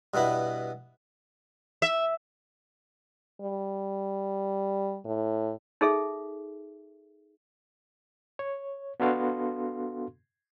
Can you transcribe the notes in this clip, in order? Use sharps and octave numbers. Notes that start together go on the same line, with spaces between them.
G2 B2 B3 E4
E5
G3
A2
D#4 G#4 A4 E5
C#5
B3 D4 F#4 A4 F5 C6